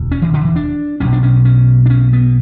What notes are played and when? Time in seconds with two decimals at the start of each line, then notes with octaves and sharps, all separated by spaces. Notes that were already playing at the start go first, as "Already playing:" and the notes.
Already playing: E1 D2
0.11 C#4
0.22 E3
0.33 D3
0.45 E3
0.56 D4
1.00 B1 B2 C#4
1.12 D4
1.23 C#4
1.45 C#4
1.86 D4
1.90 C#4
2.13 B3